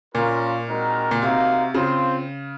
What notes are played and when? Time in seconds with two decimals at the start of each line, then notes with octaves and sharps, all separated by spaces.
0.15 A#2 A#3 C#4 F4 A#4
0.68 G#3 C4 D#4 F#4 A#4
1.11 A#2
1.22 C3 A#3 D#4 F#4 C5 F5
1.74 C#3 C4 F4 C5